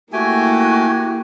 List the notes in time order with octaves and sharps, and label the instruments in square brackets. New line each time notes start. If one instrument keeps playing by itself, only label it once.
[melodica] A3 G#5 [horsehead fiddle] A#3 E4 [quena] F#4 [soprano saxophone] G4